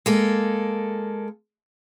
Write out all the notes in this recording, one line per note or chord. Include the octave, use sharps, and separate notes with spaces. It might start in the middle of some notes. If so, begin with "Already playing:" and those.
G#3 A#3 A4